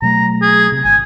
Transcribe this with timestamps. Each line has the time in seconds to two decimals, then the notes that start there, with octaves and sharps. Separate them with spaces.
0.02 B2 F#3 A3 A#5
0.42 G#4
0.72 C3
0.84 G#1 G#5